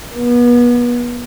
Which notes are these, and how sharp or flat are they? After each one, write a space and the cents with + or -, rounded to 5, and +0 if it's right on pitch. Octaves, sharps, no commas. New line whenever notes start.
B3 -35